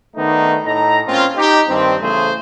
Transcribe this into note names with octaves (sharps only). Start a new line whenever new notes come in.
D#3 A3 B3 D4 D#4
A2 D#4 A#5
A#2 C4 C#4 F4
D#4 G4
G2 D#3 C4
E2 C#3 A3 G#4 C5